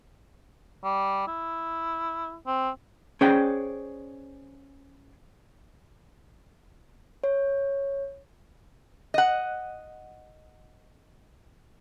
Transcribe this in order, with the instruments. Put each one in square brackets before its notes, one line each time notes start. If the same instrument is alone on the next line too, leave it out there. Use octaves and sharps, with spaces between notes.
[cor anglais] G3
E4
C4
[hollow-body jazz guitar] C#4 G#4 C5 D5 F#5 G5
[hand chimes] C#5
[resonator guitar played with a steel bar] D#5 F#5